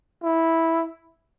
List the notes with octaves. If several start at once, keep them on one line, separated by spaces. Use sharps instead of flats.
E4